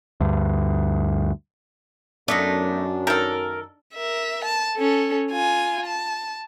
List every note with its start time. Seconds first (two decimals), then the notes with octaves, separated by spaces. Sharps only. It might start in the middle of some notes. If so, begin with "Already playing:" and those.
0.21 D2 G2
2.28 F#2 A3 B3 D4 D#4
3.07 D#3 A4 A#4
3.95 A#4 E5
4.45 A5
4.77 C#4 A4
5.31 F4 G#5
5.86 A5